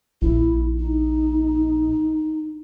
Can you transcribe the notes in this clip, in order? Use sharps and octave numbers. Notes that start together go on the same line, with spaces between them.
A#1 E4
D#4